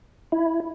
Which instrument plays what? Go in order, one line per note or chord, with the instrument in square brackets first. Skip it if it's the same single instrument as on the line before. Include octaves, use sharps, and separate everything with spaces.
[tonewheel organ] E4